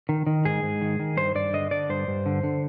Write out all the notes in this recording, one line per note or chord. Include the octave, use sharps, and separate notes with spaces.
D#3
D#3
G#2 G#4
G#2
D#3
D#3
G2 C5
G2 D5
D3 D#5
D3 D5
G2 C5
G2
D3
D3